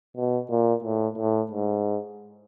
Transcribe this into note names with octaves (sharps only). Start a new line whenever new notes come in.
B2
A#2
A2
A2
G#2